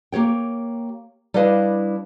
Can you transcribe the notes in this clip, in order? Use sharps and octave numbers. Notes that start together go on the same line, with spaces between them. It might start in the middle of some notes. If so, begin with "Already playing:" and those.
A#3 G4 C#5 G5
G3 D4 E4 B4 D#5 F5